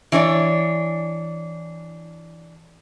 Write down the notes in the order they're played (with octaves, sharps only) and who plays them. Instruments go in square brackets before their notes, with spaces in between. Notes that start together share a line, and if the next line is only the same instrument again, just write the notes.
[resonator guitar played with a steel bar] E3 D4 C#5 D5